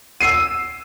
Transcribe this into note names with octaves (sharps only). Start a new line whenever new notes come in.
E6 C7 D#7